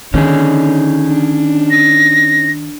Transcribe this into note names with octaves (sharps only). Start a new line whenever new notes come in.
D3 D#3 C#4 D#4 G#4
D4
A#6